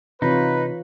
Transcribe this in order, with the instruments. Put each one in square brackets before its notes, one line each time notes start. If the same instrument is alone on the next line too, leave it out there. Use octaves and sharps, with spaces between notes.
[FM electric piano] C3 [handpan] E3 F4 C#5 [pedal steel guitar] D#4 [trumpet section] B4